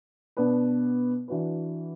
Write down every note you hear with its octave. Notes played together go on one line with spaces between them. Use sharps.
B2 B3 D4 B4
E3 D4 F#4 B4